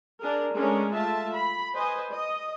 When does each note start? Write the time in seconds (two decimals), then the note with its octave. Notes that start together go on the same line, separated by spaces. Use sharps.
0.21 D4 G#4 A#4
0.54 G#3 A3 C#4 D4 A#4
0.93 A3 F4 E5 A5
1.35 B5
1.76 B4 C5 D#5 G#5
2.12 D#5